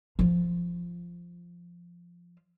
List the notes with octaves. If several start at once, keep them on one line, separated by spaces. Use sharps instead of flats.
F3 F4